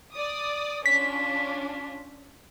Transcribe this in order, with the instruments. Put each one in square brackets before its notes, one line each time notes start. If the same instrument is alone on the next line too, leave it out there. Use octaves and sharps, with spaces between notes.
[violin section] D5 D#6
[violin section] C#4 D4 F4 [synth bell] B6